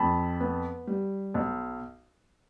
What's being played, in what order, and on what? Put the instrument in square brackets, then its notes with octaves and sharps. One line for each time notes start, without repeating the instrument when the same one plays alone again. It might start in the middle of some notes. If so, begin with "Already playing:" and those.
Already playing: [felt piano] F2 A5 B5
B3
G3
B1